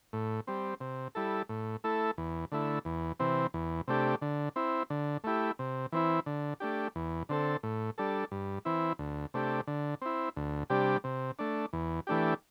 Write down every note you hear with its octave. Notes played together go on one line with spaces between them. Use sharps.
A2
G3 C4
C3
G3 E4 A4
A2
A3 E4 A4
E2
D3 A3 E4
E2
C3 E3 C4
E2
C3 A3 D4 G4
D3
C4 E4
D3
A3 E4 G4
C3
E3 C4 E4
D3
A3 D4 G4
E2
D3 C4 A4
A2
G3 D4 A4
G2
E3 C4 E4
D2
C3 A3 D4 G4
D3
C4 E4
D2
C3 G3 D4 G4
C3
A3 D4
E2
E3 A3 D4 G4